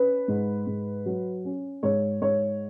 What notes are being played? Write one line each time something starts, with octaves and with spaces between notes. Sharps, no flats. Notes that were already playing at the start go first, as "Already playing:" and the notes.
Already playing: C#4 B4
G#2
G#2
F#3
C#4
G#2 C#5
G#2 C#5